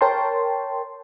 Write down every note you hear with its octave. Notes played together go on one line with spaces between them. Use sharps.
A#4 C#5 G5 A5 C6